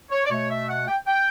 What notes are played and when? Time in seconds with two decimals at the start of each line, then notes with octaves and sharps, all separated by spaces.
0.11 C#5
0.25 D5
0.31 B2 A3 C#5
0.50 E5
0.69 F#5
0.88 G5
1.07 G5